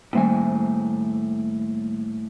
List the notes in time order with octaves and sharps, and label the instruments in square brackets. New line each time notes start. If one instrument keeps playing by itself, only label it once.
[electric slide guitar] A2 C5 G#5 [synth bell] D#3 G3 A#3